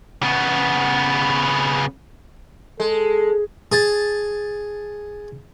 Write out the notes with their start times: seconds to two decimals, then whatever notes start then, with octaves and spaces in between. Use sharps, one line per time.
0.22 C#3 B3
2.80 G#3 A4
3.72 G#4 A5